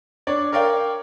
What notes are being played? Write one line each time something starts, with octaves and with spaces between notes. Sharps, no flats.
D4 C#5 D5
A#4 C#5 D5 F5 G5